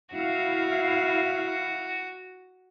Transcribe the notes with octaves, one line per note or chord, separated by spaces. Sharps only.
E4 F#4 F5